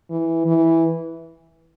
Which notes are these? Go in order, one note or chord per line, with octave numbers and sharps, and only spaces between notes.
E3
E3